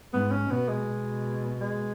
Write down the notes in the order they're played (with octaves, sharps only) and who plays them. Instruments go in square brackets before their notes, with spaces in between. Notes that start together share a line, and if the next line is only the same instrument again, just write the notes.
[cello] G#2 [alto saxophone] B3
[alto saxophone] C#4
[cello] B2 [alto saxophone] B3
[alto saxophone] G#3
[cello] B2
[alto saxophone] G#3